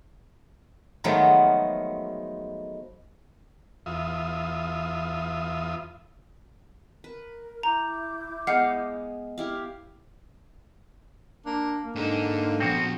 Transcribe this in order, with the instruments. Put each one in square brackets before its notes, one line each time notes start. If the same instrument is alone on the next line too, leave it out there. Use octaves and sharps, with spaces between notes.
[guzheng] D#3 F3 F#3 G#3 A3 B3
[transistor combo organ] E2 F4 E5 D#6
[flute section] A#4 [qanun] B4
[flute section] E4 D6 G6 [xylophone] A#5
[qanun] G#3 B3 F5 [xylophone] F#5 F6 C7
[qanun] E4 G4 F5
[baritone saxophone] A#3 [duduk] D4
[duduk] A#3
[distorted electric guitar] G#2 D#4 [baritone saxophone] D3
[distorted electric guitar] A#2 F3 [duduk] B3 [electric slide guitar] C4 F#4